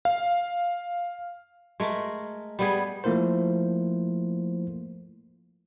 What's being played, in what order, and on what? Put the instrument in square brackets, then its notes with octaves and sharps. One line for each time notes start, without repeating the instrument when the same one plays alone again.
[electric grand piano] F5
[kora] G#3 A3 A#4
G3 B3 G#4
[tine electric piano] F3 A3 A#3 E4 A#4 C5